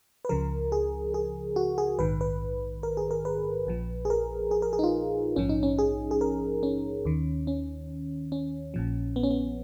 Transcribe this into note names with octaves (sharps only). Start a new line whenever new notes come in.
B4
C#2 C#3 F3 A#4
G#4
G#4
F#4
G#4
A#1 G#2 D#3 B4
B4
A#4
G#4
A#4
B4
A#1 A#2 F3
G#4
A#4
G#4
A#4
G#4
D#4
F4
A#1 G#2 F3 C#4
D#4
C#4
G#4
G#4
A#4
C#4
D#2 D#3
C#4
C#4
A#1 A#2 F3
B3
C#4
B3